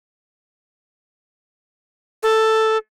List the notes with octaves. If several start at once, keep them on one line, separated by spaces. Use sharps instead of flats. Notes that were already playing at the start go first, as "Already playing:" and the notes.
A4